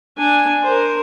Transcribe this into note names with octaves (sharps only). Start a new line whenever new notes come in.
D4 G#5
A#4 C5